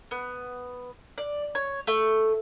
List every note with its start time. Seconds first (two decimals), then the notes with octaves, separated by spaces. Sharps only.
0.11 B3
1.18 D5
1.55 C#5
1.87 A3